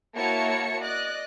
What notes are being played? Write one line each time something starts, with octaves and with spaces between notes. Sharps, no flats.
A#3 E4 F#4 C#5 A5 C#7
D5 D#5 F#6